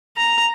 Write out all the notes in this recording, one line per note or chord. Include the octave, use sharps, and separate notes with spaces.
A#5